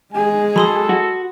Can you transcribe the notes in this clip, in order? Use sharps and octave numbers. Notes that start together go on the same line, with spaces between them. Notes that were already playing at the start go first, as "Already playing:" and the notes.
G#3 G#4 G#5
F#3 A4 B5 C6 D#6
F#4